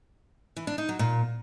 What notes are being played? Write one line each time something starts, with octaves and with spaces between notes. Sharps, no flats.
E3
D4
D#4
F#3
A#2